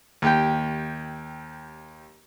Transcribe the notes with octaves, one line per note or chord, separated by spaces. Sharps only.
D#2 G4 G5